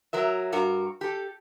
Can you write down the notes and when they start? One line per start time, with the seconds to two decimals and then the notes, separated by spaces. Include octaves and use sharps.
0.13 F#3 A#4 E5
0.52 G2 F#4 A#4
1.01 G4 A4